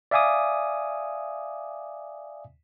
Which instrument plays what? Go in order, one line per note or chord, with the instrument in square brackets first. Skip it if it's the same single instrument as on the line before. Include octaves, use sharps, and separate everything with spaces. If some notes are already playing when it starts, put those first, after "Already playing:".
[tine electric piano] D5 E5 F5 G#5 D6 D#6